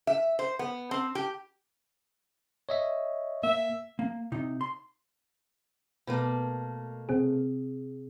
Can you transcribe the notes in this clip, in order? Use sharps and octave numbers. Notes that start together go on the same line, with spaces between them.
E5
C5
B3
C4
G4
C#5 D#5 E5
A#3 E5
A#3
C3 D#4
C6
B2 A3 A#3
C3 C4 G#4